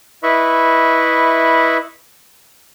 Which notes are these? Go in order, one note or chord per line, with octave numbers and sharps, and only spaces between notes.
E4 B4 D#5 E5 B5 C#6